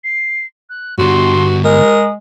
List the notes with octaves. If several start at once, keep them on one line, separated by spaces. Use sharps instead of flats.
C7
F#6
G2 D3 F#4 C6
G#3 A#4 D#6